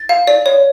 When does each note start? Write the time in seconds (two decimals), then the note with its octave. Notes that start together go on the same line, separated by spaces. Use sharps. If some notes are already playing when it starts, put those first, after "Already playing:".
Already playing: A6
0.09 F5
0.27 D5
0.46 C#5